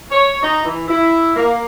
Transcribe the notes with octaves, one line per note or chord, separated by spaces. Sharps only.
C#5
D#4
E3
E4
A#3